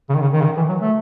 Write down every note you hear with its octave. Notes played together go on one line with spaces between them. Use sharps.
C#3
D#3
C#3
D#3
C#3
D#3
E3
F#3
A3